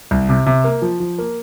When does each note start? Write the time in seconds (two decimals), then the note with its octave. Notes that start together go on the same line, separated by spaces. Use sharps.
0.11 C2
0.29 C3
0.46 C3
0.64 A#3
0.82 F3
1.00 F3
1.18 A#3